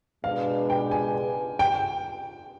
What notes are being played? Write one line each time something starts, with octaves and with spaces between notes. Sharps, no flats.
B2 G#3 D4 G#4 B4 F5
G5
G#5
G5